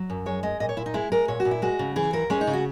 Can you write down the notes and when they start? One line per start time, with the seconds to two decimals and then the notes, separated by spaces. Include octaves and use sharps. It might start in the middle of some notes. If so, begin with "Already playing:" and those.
Already playing: F#3
0.10 F#2
0.26 G#3 C#5
0.43 G#3 D#5
0.60 A#2 D#5
0.69 C#5
0.77 A#2 E4
0.86 D#4
0.94 G#3 E4
1.12 G#3 A#4
1.28 A#2 C#5
1.40 F#4
1.45 A#2
1.51 E4
1.62 G#3 F#4
1.79 C#3
1.96 E3 G#4
2.13 D#2 A#4
2.30 G#3 C#4
2.41 D#4
2.47 C#3
2.53 F#4